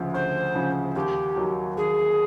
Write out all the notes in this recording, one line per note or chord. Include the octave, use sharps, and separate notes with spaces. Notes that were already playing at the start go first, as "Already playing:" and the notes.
Already playing: D2 C#3 F3
D2 C5
C#3 F3
D#2 G4
D#3 F#3
D#2 G#4